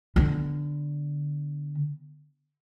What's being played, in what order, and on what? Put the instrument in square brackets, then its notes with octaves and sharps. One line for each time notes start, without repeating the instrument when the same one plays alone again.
[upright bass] D3 B3